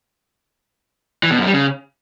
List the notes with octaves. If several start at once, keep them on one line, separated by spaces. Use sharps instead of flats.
E3
B2
F#2
G3
C#3